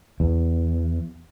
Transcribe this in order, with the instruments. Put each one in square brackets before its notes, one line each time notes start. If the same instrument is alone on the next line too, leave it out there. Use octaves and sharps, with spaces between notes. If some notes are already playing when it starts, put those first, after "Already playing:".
[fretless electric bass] E2